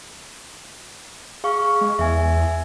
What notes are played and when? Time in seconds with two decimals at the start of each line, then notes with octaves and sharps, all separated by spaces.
1.44 G#4 F5 C#6
1.81 G#3
1.99 E2 E5 G#5